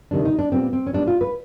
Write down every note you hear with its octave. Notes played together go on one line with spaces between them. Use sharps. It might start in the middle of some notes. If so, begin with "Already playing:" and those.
D2 C3 D#3 G3 D4
D#4
D4
A#2 G3 B3 C4
C4
C#4
A#2 G3 B3 D4
F4
B4